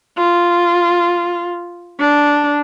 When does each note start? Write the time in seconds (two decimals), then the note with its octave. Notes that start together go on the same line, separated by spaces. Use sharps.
0.17 F4
1.99 D4